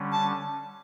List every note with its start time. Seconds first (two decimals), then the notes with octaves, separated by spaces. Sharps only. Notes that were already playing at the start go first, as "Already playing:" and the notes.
Already playing: D3 G3 C#4
0.12 A5